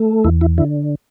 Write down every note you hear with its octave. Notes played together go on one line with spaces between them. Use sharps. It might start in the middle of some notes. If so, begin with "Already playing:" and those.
Already playing: A3
E2 E4
E4
D3 E4